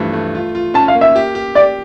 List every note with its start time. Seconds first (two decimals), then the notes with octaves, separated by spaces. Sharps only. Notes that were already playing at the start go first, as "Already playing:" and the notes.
Already playing: G2 E3 F3 A3
0.13 A3
0.35 F4
0.55 F4
0.74 C#4 A5
0.88 F5
0.95 A#3
1.01 E5
1.16 G4
1.35 G4
1.55 G4 D5